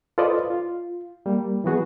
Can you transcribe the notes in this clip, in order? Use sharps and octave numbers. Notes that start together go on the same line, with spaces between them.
F4 A4 B4 C5 D5 D#5
F4
G3 A#3
E3 F#3 B3 F#4 G#4